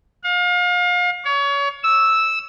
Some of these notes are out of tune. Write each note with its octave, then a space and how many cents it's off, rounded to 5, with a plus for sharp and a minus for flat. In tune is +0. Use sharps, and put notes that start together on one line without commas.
F5 +35
C#5 +30
E6 -5